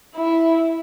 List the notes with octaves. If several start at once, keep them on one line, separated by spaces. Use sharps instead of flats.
E4